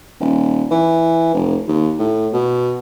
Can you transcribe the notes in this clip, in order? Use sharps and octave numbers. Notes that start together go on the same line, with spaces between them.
D#1
E3
F1
D#2
A2
B2